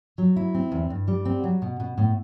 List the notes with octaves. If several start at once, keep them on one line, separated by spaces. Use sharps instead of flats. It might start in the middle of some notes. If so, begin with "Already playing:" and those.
F#3
E4
C4
E2
G2
G3
C4
F#3
B2
B2
A2